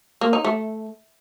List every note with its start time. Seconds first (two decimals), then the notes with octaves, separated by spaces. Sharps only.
0.21 A#3
0.33 D#4
0.45 A3